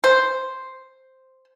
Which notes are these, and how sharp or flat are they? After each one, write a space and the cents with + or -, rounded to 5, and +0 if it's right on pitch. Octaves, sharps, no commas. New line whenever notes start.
C5 +0